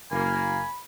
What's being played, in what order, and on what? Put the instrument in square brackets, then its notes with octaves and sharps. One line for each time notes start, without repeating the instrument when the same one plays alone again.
[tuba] F#1 [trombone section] A#3 [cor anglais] G#5 [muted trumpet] B5